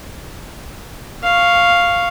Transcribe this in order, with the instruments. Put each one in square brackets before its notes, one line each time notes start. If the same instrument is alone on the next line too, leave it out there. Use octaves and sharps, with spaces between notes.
[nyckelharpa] F5 C#6